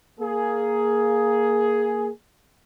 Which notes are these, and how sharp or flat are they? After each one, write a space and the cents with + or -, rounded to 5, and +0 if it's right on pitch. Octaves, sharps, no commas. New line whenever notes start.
A#3 +0 G#4 +10